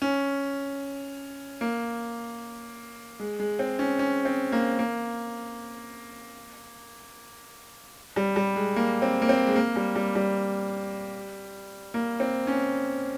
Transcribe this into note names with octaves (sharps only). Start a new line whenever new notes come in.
C#4
A#3
G#3
G#3
C4
C#4
C#4
C4
A#3
A#3
G3
G3
G#3
A#3
C4
A#3
C4
G#3
A#3
G3
G3
G3
A#3
C4
C#4